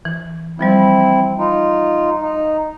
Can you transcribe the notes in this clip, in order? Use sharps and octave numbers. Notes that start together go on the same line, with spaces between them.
E3
E3 F3 G3 C4 E4
D#4 F4
D#4